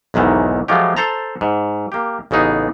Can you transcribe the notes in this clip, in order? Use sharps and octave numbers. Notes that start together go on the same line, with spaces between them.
B1 E2 G#2 D#3 E3
F3 F#3 G#3 A3 F4 G4
A4 C5 A5 A#5
G#2
A#3 G4
A1 C#3 B3 D#4 G#4